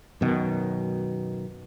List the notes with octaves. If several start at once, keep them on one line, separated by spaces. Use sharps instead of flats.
F#2 B2 D#3